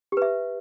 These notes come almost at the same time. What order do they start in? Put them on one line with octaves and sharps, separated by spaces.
G4 B4 E5